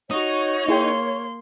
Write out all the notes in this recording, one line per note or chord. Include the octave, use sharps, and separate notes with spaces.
D#4 F#4 C#5 C#6 D#6
A#3 E4 G#4 G5 C6